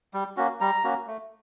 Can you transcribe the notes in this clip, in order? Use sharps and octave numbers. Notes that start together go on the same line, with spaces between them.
G3
A#3 C#4 F#4
G3 A#5
A#3 C#4 F#4
A3